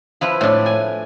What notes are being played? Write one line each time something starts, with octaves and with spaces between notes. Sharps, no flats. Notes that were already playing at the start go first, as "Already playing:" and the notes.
F3 E4 B4 B5
A2 D4
G#5